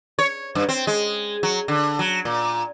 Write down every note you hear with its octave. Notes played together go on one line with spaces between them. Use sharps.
C#5
G2
C4
G#3
F#3
D3
F#3
A#2